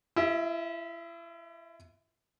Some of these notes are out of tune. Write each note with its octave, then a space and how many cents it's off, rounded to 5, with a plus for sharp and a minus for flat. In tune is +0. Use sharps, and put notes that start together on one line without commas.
E4 +35 E5 -30